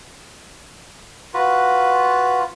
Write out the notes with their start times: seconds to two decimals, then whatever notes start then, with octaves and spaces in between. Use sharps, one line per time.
1.34 F4 F#4 B4